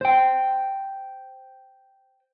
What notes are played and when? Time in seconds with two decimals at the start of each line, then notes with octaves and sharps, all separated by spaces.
0.01 C5 G5